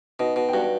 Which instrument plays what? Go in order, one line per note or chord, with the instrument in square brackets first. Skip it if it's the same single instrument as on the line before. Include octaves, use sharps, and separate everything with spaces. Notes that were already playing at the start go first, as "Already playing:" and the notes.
[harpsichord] B2 [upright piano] D#4 D#5
[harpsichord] B2
[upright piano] G5
[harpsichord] G2 [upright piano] F#4 F#5